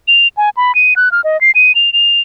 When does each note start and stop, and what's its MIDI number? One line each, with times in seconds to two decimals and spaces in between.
0.08 0.28 101
0.37 0.50 80
0.57 0.75 83
0.75 0.94 99
0.96 1.12 90
1.12 1.21 89
1.24 1.40 75
1.41 1.51 96
1.55 1.75 99
1.75 1.93 101
1.93 2.21 101